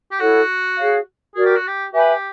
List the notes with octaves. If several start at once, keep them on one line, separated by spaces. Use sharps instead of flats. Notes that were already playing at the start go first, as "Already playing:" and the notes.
G4
E4 F#4 A4 C#5 F#5
G#4 C#5 F5
F#4 G#4 A#4 D5
G4
F#4
G4
G4 B4 E5 G#5 B5